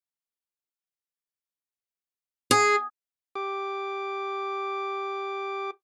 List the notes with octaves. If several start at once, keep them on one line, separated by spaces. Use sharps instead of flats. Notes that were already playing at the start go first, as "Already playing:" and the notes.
G#4
G4 D6